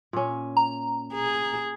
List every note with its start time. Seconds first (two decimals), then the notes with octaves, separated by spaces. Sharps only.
0.13 A#2 C#4
0.57 A#5
1.14 G#4